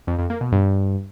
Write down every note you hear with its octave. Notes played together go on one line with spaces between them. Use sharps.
F2
F2
A#3
B2
G2